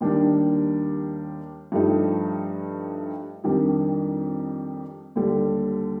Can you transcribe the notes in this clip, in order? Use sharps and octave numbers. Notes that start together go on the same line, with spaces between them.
D#2 D#3 G3 D4
G2 F3 A3 D#4 G4
F2 D#3 G3 D4
D#2 D3 G3